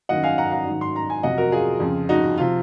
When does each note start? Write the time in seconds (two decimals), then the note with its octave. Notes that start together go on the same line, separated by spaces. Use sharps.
0.09 F#2 D#3 F#3 D#5 F#5
0.23 F5 G#5
0.38 F#5 A#5
0.52 F#5 A#5
0.67 G#2 D#3 F#3
0.81 C6
0.96 A#5
1.10 G#5
1.23 F2 C3 F#3 D#5 F#5
1.38 F#4 A#4
1.52 F4 G#4
1.80 F2 C#3 F3
2.09 D#4 F#4
2.38 C3 F3 F4